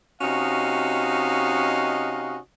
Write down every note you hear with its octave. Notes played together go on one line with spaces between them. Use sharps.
C3 C#4 D#4 F#4 D#5 F5